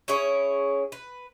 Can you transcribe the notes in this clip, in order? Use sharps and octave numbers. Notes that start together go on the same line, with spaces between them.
C#4 E4 G#4 C#5
B4